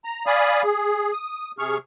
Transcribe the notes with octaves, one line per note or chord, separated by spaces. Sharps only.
A#5
D5 F5 G#5 B5 D#6
G#4
D#6
C3 G#4 C#6 F6